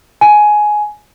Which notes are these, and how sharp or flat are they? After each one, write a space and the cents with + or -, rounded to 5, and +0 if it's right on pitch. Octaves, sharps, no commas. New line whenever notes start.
G#5 +15